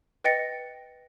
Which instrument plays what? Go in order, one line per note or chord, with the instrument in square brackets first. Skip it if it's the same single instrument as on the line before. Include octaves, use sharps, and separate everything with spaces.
[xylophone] B4 D#5 G5 A6 A#6 C#7